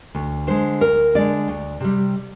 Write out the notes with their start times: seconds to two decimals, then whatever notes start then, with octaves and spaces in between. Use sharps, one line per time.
0.15 D2
0.47 D3 G#3 C5
0.81 D2 A#4
1.15 D3 G#3 D5
1.48 D2
1.80 C3 G3